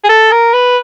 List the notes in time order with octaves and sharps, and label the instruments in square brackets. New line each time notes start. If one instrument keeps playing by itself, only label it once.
[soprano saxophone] G#4
A4
A#4
B4